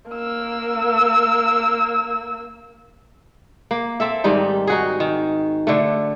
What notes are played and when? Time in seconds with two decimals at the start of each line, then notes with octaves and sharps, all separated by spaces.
0.10 A#3 E6
3.71 A#3
4.00 C4 A4 E5
4.24 G#2 D#3 G3 D#4
4.67 D#4 F#4 G#4
5.00 D#3
5.67 D3 A3